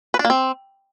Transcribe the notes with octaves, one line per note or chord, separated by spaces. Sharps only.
B4
D4
A#3
C4